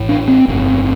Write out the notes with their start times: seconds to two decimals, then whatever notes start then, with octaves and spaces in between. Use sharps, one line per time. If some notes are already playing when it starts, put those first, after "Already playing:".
Already playing: A1 A2
0.09 D4
0.28 C4
0.48 G1 F2 C3